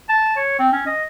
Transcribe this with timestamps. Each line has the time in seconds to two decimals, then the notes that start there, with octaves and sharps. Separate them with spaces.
0.09 A5
0.36 C#5
0.59 C4
0.73 C#4
0.86 D#5